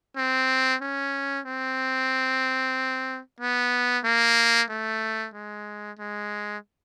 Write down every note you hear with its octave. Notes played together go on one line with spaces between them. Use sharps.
C4
C#4
C4
B3
A#3
A3
G#3
G#3